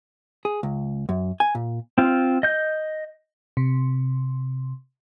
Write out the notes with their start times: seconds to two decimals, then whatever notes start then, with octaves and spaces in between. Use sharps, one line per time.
0.45 G#4
0.63 C#2
1.09 F#2
1.40 G#5
1.55 A#2
1.98 C4 F4
2.43 D#5 G6
3.57 C3